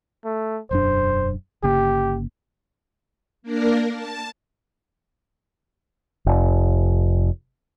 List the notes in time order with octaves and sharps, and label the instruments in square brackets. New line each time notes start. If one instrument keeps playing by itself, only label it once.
[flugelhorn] A3
[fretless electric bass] E1 F#2 D4 [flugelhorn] C5
[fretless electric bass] G1 C#3 A#3 [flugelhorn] G4
[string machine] A#3 D4 A#4
A5
[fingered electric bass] F1